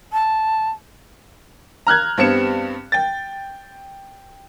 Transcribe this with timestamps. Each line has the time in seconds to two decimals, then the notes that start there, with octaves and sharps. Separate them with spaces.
0.13 A5
1.87 A#5 F6 F#6 G#6
2.17 G2 G3 B3 C4 C#7 E7
2.92 G5 A6